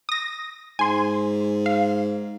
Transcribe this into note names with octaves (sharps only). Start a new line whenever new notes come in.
D#6 A#6
G#2 G#5 C6
F5